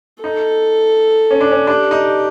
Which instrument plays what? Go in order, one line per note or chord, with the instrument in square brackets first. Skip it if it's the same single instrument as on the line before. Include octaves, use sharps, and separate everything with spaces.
[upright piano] D#4 [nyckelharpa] A4
[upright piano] C#4
D4
C#4
[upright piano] D4 [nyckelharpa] G4
[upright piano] D#4